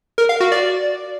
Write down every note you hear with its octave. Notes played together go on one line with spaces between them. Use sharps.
A#4
F5
F#4
D5